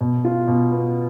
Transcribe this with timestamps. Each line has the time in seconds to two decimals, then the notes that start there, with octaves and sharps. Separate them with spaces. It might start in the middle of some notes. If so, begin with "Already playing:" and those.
0.01 B2
0.25 F4
0.48 B2
0.71 B3